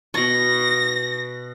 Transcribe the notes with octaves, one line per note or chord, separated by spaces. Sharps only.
B2 C#6 A#6